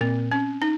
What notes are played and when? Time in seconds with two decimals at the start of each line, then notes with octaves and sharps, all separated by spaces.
0.01 A#2 C4
0.31 C#4
0.62 D#4